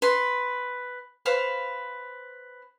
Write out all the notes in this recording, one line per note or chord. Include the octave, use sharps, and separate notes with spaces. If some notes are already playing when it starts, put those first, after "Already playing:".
B4 C6
B4 C5 F5